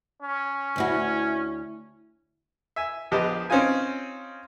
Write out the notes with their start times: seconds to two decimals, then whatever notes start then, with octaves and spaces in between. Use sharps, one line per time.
0.22 C#4
0.76 D2 E4 F#4
2.76 E5 G#5
3.12 A#1 F3 B3 G4 D#5
3.50 C4 C#4 D#4 F4 G#5